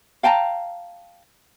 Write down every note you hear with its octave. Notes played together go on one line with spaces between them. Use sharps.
F5 G5 A5 A#5